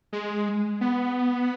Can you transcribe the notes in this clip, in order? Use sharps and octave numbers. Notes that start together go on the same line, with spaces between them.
G#3
B3